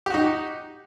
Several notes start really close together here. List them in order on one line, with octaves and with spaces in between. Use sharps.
G4 F#4 D#4